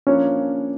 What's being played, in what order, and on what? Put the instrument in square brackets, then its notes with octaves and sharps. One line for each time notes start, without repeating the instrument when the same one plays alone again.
[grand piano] F3 A#3 D4 F4 C#5 [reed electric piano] C#4